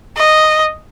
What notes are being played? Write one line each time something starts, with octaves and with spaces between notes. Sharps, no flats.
D#5